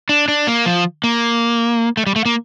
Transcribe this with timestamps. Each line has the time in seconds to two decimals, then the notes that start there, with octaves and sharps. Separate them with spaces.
0.09 D4
0.28 D4
0.47 A#3
0.66 F3
1.04 A#3
1.97 A3
2.06 G3
2.16 A3
2.26 A#3